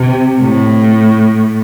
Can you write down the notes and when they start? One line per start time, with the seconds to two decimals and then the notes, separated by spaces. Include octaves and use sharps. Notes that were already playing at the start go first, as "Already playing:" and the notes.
Already playing: C3
0.41 A2